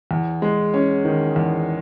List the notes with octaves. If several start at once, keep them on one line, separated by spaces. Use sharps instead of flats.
E2
G#3
C#4
D#3
E2